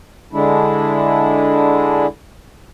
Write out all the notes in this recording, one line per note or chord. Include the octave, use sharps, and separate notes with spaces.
D3 G#3 D4 E4